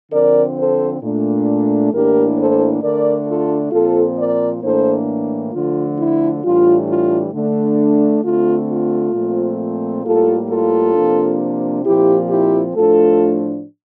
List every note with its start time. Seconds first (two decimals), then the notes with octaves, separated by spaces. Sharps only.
0.11 D3 F3 C4 A#4 D5
0.56 A4 C5
1.01 A#2 A3 D4
1.92 A2 E3 A#3 D4 G4 A#4
2.37 A4 C5
2.82 D3 A3 D4 A#4 D5
3.27 F4 A4
3.72 A#2 F3 C4 F4 A4
4.17 A#4 D5
4.62 A2 E3 A#3 D4 A4 C5
5.53 D3 F3 A3 F4
5.97 E4
6.43 A2 E3 G3 D4 F4
6.88 F4
7.33 D3 A3 D4
8.24 D3 A3 C4 F4
8.68 F4
9.13 A#2 F3 A3 C4
10.03 A2 G3 A#3 F4 A4
10.49 F4 A4
10.94 C3 F3 A#3 D4
11.84 A#2 F3 C4 E4 G4
12.29 E4 G4
12.75 A2 F3 A3 D4 F4 A4